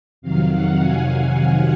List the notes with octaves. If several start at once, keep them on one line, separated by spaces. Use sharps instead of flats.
F2 C3 D#3 F#3 F5
F#5
G#5
G#5
F#5